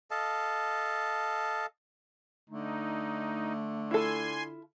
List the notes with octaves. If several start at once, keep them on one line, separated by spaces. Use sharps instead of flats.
A4 D#5 F5 A5
D3 A3 D#4
E4 F4 A4 G#5 C6